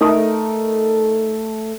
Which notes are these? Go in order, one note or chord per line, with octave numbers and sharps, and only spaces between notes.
A3 D#4 A#4 D#6